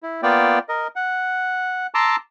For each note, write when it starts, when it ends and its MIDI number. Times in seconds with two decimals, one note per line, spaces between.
0.03 0.21 64
0.23 0.59 58
0.23 0.59 59
0.23 0.59 65
0.23 0.59 74
0.23 0.59 79
0.69 0.87 70
0.69 0.87 75
0.96 1.87 78
1.94 2.16 81
1.94 2.16 82
1.94 2.16 84
1.94 2.16 86
1.94 2.16 88